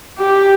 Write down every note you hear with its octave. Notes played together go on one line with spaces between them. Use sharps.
G4